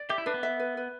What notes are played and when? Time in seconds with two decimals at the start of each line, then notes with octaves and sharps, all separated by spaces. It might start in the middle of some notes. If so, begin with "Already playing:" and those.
Already playing: D5
0.09 G4 E5
0.18 E4
0.26 D4 B4
0.34 B3
0.43 E5
0.60 B4
0.77 B4